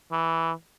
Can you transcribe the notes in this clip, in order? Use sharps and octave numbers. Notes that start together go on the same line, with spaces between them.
E3